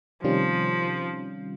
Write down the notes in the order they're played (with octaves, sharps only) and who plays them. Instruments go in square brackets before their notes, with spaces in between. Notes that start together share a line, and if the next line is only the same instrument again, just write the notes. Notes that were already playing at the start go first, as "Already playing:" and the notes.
[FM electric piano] C3 D#3 G3 C#4 F4 [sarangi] F3